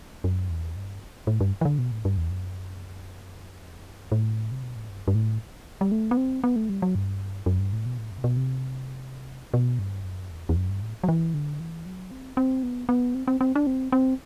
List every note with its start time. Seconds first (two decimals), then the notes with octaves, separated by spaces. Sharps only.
0.24 F#2
0.50 E2
0.76 G2
1.27 A2
1.40 G2
1.61 E3
1.65 D3
1.78 B2
1.92 A2
2.05 G2
2.18 E2
2.30 F#2
3.65 E2
3.75 F#2
3.85 G2
4.12 A2
4.51 C3
4.63 B2
4.76 A2
4.89 G2
5.08 G2
5.15 A2
5.81 G3
5.92 A3
6.11 B3
6.17 C4
6.44 B3
6.56 A3
6.69 G3
6.82 F#3
6.95 G2
7.46 F#2
7.59 G2
7.73 A2
7.86 B2
7.98 A2
8.11 F#2
8.18 C3
8.24 B2
8.37 C3
9.54 B2
9.79 G2
10.04 F#2
10.30 E2
10.49 E2
10.56 F#2
10.69 G2
10.82 A2
11.03 F#3
11.08 E3
11.34 D3
11.60 E3
11.86 F#3
12.11 C4
12.37 C4
12.63 B3
12.89 B3
13.15 C4
13.28 C4
13.41 C4
13.55 D4
13.67 C4
13.92 C4